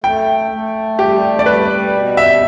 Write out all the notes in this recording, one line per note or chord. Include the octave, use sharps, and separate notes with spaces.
A3 G5
A3
G3 G4
D5
G3 B4
B2
E5